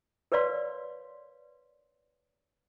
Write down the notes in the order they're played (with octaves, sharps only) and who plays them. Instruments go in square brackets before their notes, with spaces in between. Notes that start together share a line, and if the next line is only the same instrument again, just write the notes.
[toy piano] A#4 B4 C#5 D5 F5 C6